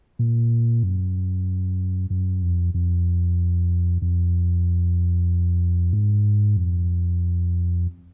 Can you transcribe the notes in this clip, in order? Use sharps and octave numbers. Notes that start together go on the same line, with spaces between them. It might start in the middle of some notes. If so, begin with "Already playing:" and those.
A#2
F#2
F#2
F2
F2
F2
G#2
F2